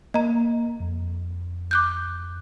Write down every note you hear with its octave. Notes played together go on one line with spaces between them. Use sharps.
A#3 D#5 A#5
F2
D6 F#6 G6